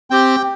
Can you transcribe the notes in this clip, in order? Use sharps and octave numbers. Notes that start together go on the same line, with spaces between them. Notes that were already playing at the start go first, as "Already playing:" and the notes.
C4 G4 G5